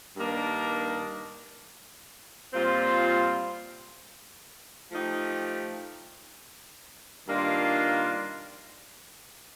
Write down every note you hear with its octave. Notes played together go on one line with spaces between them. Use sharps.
G2 D#3 A#3 D4
A#2 G3 C4 F4
F3 A3 D#4 G4
G2 D#3 A#3 D4 F4